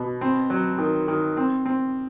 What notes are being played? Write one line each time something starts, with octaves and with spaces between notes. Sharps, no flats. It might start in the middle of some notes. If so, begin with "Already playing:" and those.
Already playing: B2
C4
F#3
D#3
D#3
C4
C4